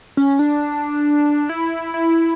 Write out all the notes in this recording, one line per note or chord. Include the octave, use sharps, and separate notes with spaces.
C#4
D4
E4
E4